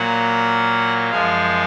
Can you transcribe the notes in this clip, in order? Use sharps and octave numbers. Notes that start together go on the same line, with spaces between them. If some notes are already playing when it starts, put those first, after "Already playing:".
Already playing: A#2 F#3 A#3 F#5
F#2 F3 G#3 F5